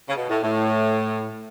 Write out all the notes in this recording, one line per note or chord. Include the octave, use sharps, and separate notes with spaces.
C#3
B2
A2
A2